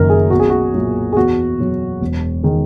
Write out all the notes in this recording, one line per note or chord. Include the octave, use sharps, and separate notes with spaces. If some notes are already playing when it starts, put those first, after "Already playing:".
Already playing: F#1 F#2 D#3 A#4
G#4
B1 F#4
G#4
F#4
A#2 F#3
G#4
E2 F#4
B2 F#3
E1
D#3 G#3